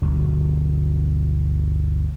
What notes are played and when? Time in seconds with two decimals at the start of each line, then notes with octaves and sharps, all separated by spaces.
0.02 G1 D2 B2 F#3